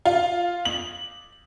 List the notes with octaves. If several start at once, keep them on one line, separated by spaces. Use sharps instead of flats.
F4
F#7